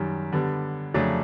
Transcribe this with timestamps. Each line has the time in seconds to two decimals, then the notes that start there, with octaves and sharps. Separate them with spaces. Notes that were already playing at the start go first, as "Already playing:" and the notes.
Already playing: F#2 D#3 G3
0.33 D3 G3 B3
0.94 F2 C#3 F#3 A3 D4